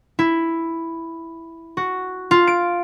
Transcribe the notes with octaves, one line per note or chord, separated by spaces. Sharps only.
E4
F#4
F4
D7